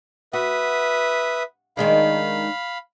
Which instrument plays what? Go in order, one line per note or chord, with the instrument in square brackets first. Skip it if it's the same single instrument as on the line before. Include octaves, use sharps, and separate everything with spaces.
[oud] F#4 [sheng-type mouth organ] B4 E5 D#6
[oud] D#3 G#3 D4 [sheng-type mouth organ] F5 B5